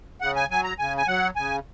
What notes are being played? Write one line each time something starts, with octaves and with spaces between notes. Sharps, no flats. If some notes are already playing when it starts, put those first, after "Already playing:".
C#3 F#5
G#5
F#3 G#5
A#5
C#3 G#5
G#5
F#3 F#5
C#3 G#5